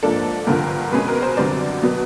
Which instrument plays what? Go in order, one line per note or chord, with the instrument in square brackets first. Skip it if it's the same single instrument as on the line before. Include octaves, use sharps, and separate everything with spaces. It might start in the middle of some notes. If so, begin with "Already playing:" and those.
[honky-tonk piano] G#2 F3 A#3 D4 A4
G2 D3 F3 A#4
B2 G#3 C#4 B4
A#4
C5
F#2 D3 G3 C4 D5
B2 F#3 B3